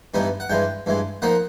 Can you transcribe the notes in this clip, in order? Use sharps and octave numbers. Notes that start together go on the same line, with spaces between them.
G2 E3 G3 B3 D#4
F#5
G2 E3 G#3 G5
G2 E3 G#3
F3 A#3 D#4 F#5